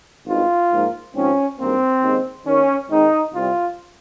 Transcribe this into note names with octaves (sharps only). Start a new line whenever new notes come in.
G#1 G2 D#3 F4
G#2 F3 A#3
G#1 G#2 F3 C4 C#4
G#1 G2 D#3 A#3 C4
D#2 C#3 G#3
D#2 D#3 A#3 C#4
G#2 D#3 G#3 C4 D#4
C2 C3 G3 F4